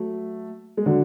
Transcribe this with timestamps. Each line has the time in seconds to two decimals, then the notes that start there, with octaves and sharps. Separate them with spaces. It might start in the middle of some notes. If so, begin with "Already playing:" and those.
Already playing: F#3 A3
0.77 G#3
0.86 D3 F#3